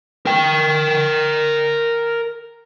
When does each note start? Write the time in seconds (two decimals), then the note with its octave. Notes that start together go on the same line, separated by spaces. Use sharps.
0.26 A#4 G5